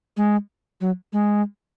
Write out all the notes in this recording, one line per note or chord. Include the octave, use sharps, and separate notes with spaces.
G#3
F#3
G#3